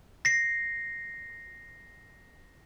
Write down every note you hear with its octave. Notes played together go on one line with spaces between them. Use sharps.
A#6 C7